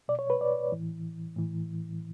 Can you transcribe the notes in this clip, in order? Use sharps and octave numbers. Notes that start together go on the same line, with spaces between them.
B2 D5
C#5
B4
D5
A2 E3
A2 E3